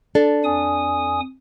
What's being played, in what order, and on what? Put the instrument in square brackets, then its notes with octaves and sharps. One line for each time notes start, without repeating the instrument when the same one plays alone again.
[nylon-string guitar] D4 A4
[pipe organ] F2 G#5 D#6